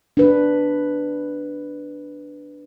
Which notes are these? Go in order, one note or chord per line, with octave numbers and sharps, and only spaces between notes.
D4 B4